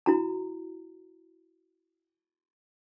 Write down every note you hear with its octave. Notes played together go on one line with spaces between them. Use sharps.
E4 F#4 A#5